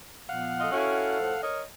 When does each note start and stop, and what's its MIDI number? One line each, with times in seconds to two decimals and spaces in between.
0.29 0.67 46
0.29 0.67 53
0.29 0.67 59
0.29 1.42 77
0.29 1.42 78
0.60 0.71 65
0.60 0.71 69
0.60 0.71 75
0.72 1.18 61
0.72 1.18 64
0.72 1.18 66
0.72 1.45 69
1.20 1.34 45
1.20 1.34 53
1.41 1.62 70
1.41 1.62 73
1.41 1.62 75